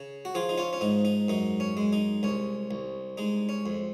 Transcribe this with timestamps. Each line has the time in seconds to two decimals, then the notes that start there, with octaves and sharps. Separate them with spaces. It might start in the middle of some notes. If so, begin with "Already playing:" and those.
Already playing: C#3
0.25 F#4
0.35 F3 F4 G#4
0.49 D#4
0.58 C#4 F4
0.73 C#4
0.81 G#2 D#4
1.05 D#4
1.28 F#2 D#4
1.60 C#4
1.77 G#3
1.93 D#4
2.23 C2 C#4
2.71 C2
3.18 G#3 D#4
3.49 C#4
3.66 F2